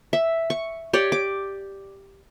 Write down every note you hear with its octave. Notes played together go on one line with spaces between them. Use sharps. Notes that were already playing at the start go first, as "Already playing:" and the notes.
E5
C#6
G4 C#5 D5
D6